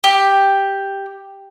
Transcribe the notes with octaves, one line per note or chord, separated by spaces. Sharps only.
G4